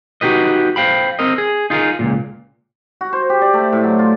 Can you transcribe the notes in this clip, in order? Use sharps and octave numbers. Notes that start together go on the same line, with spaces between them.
D#4 F#4 G4 B4 D#5
C5 F5 G5 B5
C4 A#4 D#5
G#4
D#4 F4 G#4 A#4
C#2 F#2 A#2
F#4
C5
G4
D5
A3
A2
F#3
F4